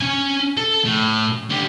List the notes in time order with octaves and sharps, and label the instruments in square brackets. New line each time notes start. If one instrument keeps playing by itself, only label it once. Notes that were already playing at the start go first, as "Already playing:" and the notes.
[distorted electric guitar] C#4 G#5
A4
A2
D3 G4